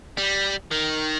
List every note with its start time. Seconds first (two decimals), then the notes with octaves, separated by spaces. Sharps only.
0.17 G3
0.71 D#3